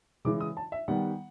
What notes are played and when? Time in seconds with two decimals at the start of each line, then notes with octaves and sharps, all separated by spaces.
0.25 C#3 E3 G#3 D6
0.40 D#6
0.57 A5
0.72 E5
0.88 D#3 G3 B3 F#5